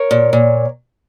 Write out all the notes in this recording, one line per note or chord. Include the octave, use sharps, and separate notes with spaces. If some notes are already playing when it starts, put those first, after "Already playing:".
Already playing: A#4 C#5
A#2
A#2